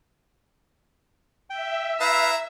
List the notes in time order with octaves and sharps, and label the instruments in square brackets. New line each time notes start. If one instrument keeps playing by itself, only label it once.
[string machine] E5 [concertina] G5
[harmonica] E4 A#5 E6 [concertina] B4 F5